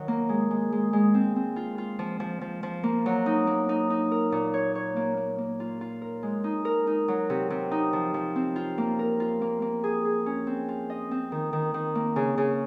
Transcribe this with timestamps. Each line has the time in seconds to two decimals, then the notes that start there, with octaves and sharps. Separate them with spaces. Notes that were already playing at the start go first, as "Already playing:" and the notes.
Already playing: D#3 F#3
0.08 A#3
0.29 G#3
0.51 G#3
0.72 G#3
0.93 G#3
1.14 C4
1.36 C4
1.56 F4
1.78 F4
1.99 F3
2.20 F3
2.41 F3
2.63 F3
2.83 A#3
3.06 F#3
3.26 D#4
3.47 A#3
3.69 D#4
3.90 D#4
4.11 A#4
4.32 A#2
4.54 C#5
4.75 C#5
4.96 A#3
5.17 A#3
5.38 A#3
5.60 F4
5.81 F4
6.02 A#4
6.23 G#3
6.44 D#4
6.65 A#4
6.87 D#4
7.08 F#3
7.30 C3
7.50 C3
7.71 D#4
7.93 F3
8.14 F3
8.36 C4
8.56 F4
8.78 A#3
8.99 A#4
9.20 F4
9.41 A#3
9.62 A#3
9.84 G#4
10.05 G#4
10.26 C#4
10.47 C4
10.68 F4
10.90 D#5
11.11 C4
11.32 D#3
11.53 D#3
11.74 D#3
11.95 A#3
12.16 C#3
12.38 C#3